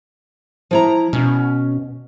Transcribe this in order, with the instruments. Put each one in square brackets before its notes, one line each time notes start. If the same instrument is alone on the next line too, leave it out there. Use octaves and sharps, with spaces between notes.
[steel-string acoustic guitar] F3 E4 A#5
[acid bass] B2 [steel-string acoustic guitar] C#4